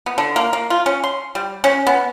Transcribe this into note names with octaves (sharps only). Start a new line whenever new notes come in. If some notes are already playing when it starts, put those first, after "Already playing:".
B3
D3
A#3
A#3
F4
C#4
C6
G3
C#4
B3